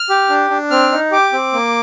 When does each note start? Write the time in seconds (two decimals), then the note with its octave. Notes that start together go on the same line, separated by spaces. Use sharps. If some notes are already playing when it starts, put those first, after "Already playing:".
Already playing: F6
0.10 G4
0.29 D4
0.51 D4
0.71 C4 F6
0.92 D#4
1.12 G4 D6
1.33 C4
1.53 A#3